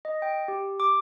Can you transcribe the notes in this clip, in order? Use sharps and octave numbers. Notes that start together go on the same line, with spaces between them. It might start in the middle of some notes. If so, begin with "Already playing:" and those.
D#5
G5
G4
D6